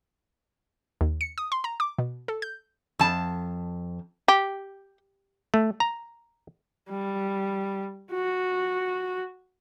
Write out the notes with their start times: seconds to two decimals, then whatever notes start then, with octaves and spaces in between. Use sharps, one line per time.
1.01 D#2
1.21 C#7
1.38 D#6
1.52 C6
1.64 A#5
1.80 D6
1.99 B2
2.28 A4
2.42 G6
2.99 F2 A5
4.28 G4
5.54 A3
5.80 A#5
6.89 G3
8.12 F#4